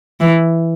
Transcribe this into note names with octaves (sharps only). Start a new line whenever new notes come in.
E3